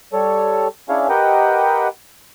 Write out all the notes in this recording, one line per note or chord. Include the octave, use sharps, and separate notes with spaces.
G3 A4 C#5
C#4 D4 E4 G#4 C#5 F5
G4 A#4 B4 D#5 F#5 G5